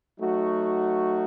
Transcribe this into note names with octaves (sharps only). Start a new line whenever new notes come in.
F#3 A3 D#4 F#4